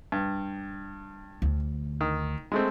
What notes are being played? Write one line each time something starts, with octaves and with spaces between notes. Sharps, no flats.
G2
D2
D#3
G#3 A3 C4